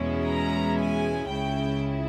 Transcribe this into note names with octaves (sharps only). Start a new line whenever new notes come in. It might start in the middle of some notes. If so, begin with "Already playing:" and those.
Already playing: E2 B2 G#3 C#4 E4
A#5
G#5
C#2 C#3 G#3 C#4 E4 G5